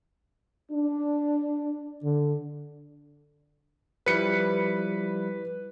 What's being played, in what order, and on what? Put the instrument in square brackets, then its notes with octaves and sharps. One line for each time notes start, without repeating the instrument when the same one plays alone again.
[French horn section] D4
D3
[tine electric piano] F3 G3 E4 [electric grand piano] B4 C#7